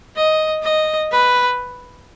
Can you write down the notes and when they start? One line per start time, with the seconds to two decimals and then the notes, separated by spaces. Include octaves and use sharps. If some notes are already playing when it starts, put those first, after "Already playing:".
0.16 D#5
0.63 D#5
1.11 B4